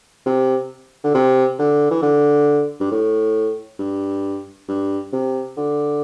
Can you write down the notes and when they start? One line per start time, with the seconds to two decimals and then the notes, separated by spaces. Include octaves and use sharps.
0.26 C3
1.04 D3
1.14 C3
1.59 D3
1.91 E3
2.02 D3
2.80 G2
2.92 A2
3.79 G2
4.68 G2
5.13 C3
5.57 D3